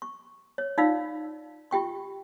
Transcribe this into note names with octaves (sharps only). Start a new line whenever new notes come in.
C#6
C#5
D#4 F4 D5 F5 E6
F4 G4 G5 C#6